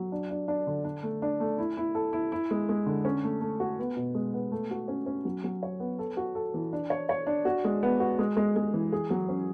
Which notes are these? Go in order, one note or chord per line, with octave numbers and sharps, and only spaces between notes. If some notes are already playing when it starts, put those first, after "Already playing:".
Already playing: F#3
D4
D4
D4
D3
D4
A3
D4
A3
E4
E4
A4
E4
E4
G#3
G#3
D3
C#4
A3
A3
F#4
B3
B2
G#3
B3
A3
F#4
C#4
C#4
F#3
F#3
C#5
B3
A4
F#4
A4
E3
D4
C#5
C#5
D4
F#4
G#3
B3
F#4
G#3
G#3
G#3
E3
G#4
F#3
C#4